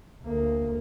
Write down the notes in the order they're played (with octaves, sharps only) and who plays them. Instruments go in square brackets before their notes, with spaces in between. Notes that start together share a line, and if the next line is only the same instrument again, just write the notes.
[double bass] D2 A#3